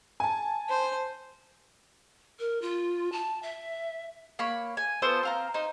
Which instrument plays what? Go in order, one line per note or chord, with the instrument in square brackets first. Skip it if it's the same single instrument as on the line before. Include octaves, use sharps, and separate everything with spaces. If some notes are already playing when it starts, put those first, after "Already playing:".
[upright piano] G#5 A5
[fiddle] C5
[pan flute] A#4
F4
A5
E5
[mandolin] A#3 C#5 B5
G#5
B3 F4 A4 C5
C4 F5 A#5
D#4 C5